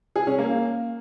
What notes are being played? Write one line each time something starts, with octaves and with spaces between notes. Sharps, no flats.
G#4
C#4
A#3